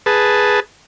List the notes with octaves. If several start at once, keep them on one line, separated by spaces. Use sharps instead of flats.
G#4 B4 A5